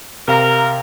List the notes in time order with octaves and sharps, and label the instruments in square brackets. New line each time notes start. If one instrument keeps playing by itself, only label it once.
[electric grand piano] C3 F5 A#5 [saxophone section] A#4